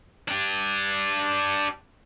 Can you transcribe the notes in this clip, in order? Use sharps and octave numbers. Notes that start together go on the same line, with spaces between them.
D4 G4